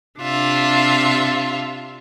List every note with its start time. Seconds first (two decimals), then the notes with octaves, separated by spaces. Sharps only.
0.20 C3 D4 F4 E5